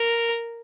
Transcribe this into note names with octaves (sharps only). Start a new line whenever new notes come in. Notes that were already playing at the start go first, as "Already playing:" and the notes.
Already playing: A#4